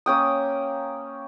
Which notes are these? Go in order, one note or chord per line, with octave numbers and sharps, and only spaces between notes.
A#3 C#4 G5 D#6